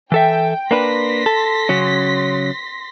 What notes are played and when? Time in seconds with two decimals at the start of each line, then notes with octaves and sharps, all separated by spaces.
0.12 E3 A4 E5 G5
0.71 A#3 D4 B4 C6 A#6 B6
1.26 A4
1.69 C#3 F#3 C#4